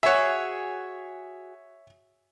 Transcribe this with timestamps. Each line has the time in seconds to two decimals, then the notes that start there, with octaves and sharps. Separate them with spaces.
0.03 F#4 G#4 C#5 E5